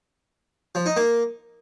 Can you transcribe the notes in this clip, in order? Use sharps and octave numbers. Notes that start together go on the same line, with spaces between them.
F3
D#4
A#3